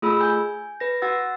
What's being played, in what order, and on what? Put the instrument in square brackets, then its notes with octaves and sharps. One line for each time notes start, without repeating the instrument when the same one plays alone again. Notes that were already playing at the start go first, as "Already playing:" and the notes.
[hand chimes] A3 F4 G#4 B5 E6
G#5 G6
B4 A#6
F#4 F#5 E6 A6